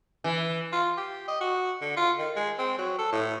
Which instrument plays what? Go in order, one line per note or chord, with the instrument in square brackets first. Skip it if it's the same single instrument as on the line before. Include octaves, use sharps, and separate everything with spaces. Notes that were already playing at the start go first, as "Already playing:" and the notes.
[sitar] E3
[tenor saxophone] F4
G4
D#5
F#4
D3
F4
D#3
G#3
C4
F#3
A4
A2